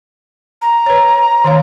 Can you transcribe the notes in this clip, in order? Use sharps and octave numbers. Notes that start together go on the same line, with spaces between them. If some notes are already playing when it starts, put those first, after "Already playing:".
A#5
B4 C#5
D#3 C#5 F5